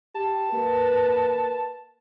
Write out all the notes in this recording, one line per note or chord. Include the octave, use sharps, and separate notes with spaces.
G4 A5
A#3 B4